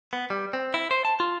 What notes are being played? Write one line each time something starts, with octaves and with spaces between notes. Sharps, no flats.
B3
G3
C4
E4
C5
A5
F4